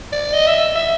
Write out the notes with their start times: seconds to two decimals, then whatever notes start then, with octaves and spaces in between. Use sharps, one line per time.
0.12 D5
0.33 D#5
0.47 E5
0.75 E5